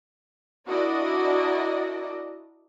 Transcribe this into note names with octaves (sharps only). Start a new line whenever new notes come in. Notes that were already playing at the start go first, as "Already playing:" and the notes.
D4 E4 F#4 A#4 D5 D#5